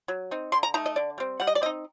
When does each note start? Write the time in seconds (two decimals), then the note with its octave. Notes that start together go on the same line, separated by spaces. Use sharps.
0.08 F#3
0.31 C4 D#4
0.52 D3 C6
0.63 A#5
0.74 A3 D#4 A#5
0.86 D#5
0.96 D3 D5
1.18 G3 C4
1.40 G3 F#5
1.47 D#5
1.55 D5
1.62 C4 D#5
1.66 D#4